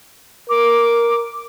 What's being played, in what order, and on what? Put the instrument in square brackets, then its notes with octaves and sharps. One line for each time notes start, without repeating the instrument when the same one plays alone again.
[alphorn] A#4 [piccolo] D6